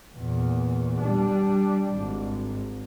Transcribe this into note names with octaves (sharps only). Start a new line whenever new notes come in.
E2 A#2
G3 D4
G#1